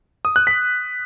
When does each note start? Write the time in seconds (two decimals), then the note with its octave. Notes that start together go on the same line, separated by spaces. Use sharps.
0.25 D#6
0.36 F#6
0.47 B6